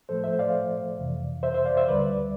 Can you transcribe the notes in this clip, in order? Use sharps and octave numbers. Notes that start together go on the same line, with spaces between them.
A2 F3 A3 A4 C5
C5 E5
D5 F5
F2 C3 E3
C5 E5
C5 E5
D5 F5
C5 E5
D2 D3 G3 B4 D5